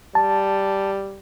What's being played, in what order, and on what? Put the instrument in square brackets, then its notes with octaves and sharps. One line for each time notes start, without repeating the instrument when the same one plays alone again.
[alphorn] G3 [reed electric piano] A5